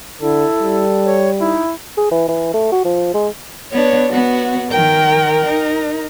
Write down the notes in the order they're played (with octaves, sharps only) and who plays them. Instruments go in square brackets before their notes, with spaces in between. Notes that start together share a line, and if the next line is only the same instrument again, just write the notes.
[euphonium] D3 [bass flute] E4 [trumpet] A4
[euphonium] G3
[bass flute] C#5
[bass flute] D#4 [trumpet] E4
[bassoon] G#4
E3
E3
A3
F#4
F3
G#3
[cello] B3 D4 [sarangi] C#5
[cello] B3 [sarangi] F#4
[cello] D#3 G5 [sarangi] A#4
[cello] D#4